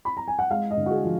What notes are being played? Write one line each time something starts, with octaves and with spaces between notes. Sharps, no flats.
B5
A#5
G#5
F#5
G#3 F5
D#5
D3
F#4
G#4
F3